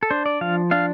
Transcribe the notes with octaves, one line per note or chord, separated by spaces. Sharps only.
A4
D4 C5
D5
F3 F5
D4 F5